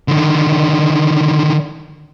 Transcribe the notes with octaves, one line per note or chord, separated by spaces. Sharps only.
D3 D#3